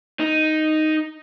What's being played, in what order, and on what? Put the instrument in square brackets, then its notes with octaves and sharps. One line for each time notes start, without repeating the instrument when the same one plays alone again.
[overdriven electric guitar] D#4